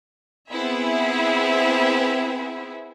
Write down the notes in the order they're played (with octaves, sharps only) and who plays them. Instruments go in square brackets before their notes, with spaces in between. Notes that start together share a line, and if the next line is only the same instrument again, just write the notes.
[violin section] B3 C4 E4 G#4 E5